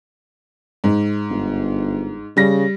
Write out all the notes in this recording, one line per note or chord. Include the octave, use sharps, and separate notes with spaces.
G#2
G1
C#3 G3 A#6